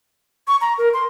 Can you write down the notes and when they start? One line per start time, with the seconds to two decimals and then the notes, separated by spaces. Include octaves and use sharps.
0.48 C#6
0.61 A#5
0.78 A#4
0.94 C6